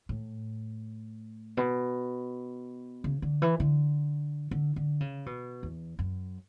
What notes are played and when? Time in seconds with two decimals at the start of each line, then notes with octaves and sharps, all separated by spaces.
0.09 A2
1.57 B2
3.04 C#3
3.22 D3
3.42 E3
3.60 D3
4.51 D3
4.76 D3
5.00 C#3
5.26 B2
5.63 E2
5.99 F#2